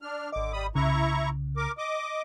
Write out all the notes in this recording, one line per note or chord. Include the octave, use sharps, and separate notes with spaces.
D4 F6
G#1 D3 D#5 D6
G3 B5 D#6
C2 C#3 E4 A#5 C#6
A#4 D6
D#5 D6